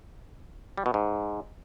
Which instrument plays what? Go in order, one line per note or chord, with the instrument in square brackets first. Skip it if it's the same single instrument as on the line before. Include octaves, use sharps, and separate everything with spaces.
[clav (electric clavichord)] G3
B2
G#2